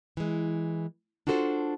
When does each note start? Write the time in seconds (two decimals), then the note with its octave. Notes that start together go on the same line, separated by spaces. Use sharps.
0.17 E3 G#3
1.27 D4 F4 F#4 A4 B4 C5